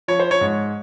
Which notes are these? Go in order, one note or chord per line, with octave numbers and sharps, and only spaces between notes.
F3 C#5
C5
C#5
G#2